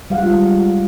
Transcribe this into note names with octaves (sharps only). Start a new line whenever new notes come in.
G3 F5 F#5
G#3 F4